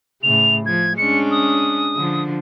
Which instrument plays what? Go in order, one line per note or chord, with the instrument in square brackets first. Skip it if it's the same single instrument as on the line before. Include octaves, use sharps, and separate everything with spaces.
[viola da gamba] A2 C#3 [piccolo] F7
[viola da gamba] F3 [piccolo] G#6
[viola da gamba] G#3 C#4 D4 [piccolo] C#7
[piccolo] D#6
[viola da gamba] D3 F3